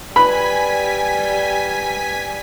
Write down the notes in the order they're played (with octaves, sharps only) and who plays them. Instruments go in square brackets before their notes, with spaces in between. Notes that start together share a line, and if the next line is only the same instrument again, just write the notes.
[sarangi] G3 [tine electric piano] B4 [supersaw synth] G#5 B6 [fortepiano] B5